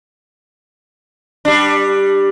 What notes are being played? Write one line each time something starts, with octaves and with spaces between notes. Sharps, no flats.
G3 D4